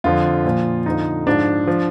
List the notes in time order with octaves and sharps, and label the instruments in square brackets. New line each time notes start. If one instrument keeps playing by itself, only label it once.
[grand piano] F2 D3 F3 F4
A#2 F3
F2 D3 F3 D#4
G#2 F3 D4
F3